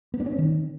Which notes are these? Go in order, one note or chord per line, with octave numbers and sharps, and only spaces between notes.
B3
D4
C#4
C4
D#3